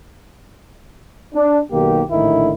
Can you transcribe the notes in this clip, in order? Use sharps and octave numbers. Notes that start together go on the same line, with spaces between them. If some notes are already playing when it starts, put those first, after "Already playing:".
D4
B1 D#3 A#3 G4
A#1 A2 D3 D#3 E4